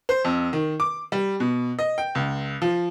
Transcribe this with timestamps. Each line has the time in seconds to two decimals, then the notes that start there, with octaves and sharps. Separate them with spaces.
0.09 C5
0.25 F2
0.53 D#3
0.80 D6
1.12 G3
1.40 B2
1.79 D#5
1.98 G5
2.15 C#2
2.62 F3